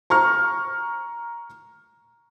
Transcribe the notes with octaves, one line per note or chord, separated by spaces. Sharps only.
A#5 C#6 F6